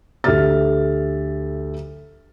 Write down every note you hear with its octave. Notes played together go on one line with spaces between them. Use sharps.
D2 A3 G4 E5 F6 A6